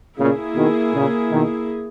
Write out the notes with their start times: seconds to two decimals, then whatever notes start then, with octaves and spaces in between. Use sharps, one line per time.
0.18 A#2 C#3 A#3 E4 G#4
0.55 B2 D#3
0.93 A#2 C#3
1.30 B2 D#3